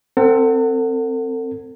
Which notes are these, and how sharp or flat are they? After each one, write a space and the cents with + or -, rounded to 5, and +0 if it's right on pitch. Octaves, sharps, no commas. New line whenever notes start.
C4 +0 A4 +40 F#5 +0